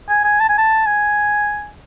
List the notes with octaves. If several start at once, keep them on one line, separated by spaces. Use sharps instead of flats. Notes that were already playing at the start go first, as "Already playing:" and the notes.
G#5
G#5
A5
G#5
A5
G#5